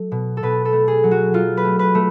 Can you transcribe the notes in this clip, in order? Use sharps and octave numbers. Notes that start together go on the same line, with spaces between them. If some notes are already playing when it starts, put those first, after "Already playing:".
Already playing: F#3 A3
B2
A4
B2 B4
A4
A3
G#4
F#3
F#4
F#3 F4
B4
A3
B4
A3